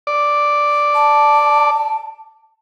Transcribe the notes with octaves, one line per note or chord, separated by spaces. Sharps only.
D5
A5